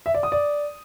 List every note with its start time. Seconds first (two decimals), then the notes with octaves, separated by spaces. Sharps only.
0.06 E5
0.14 D5
0.23 D#6
0.32 D5